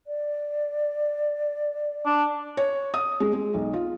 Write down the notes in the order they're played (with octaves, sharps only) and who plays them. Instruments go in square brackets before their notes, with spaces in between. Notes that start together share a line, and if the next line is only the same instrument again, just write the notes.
[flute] D5
[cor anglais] D4
[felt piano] C#5
D#6
G#3
G#3
B1
F4